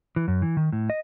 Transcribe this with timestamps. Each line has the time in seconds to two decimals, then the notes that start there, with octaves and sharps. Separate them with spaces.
0.16 E3
0.28 F#2
0.42 E3
0.57 D#3
0.72 A2
0.90 D#5